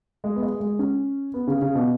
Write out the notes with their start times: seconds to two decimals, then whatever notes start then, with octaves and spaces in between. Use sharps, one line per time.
0.24 G#3
0.36 B3
0.42 G#3
0.60 G#3
0.79 C#4
1.34 B3
1.47 C#3
1.62 C#3
1.75 B2